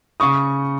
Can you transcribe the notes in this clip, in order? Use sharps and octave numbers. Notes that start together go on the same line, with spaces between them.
C#3 C#6 D#6